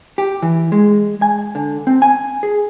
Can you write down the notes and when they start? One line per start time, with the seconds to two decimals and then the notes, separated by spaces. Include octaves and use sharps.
0.18 G4
0.42 E3
0.72 G#3
1.22 G#5
1.55 D3
1.87 C4
2.02 G#5
2.43 G#4